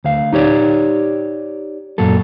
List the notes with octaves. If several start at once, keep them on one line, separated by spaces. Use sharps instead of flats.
D2 F5
D#4 G4 C#5 D5
F#2 A#2 F#3 A4